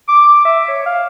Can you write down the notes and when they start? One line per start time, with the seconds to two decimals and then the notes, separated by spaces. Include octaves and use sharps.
0.08 D6
0.45 E5
0.68 C#5
0.86 F5